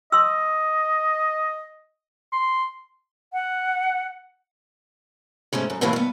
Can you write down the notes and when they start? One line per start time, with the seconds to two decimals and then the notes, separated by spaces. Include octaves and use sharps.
0.12 D#5 C6 E6
2.33 C6
3.33 F#5
5.53 G#2 G#3 A3 C#4
5.70 F#2
5.81 A2 C3 D#3 E3 A3 A#3
5.93 G2 B3